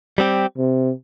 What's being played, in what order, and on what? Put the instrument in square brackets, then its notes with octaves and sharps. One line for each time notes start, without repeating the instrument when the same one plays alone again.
[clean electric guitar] G3 C4 G4
[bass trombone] C3